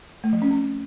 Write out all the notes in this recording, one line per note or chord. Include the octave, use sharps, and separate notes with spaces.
A3
F3
C#4
C4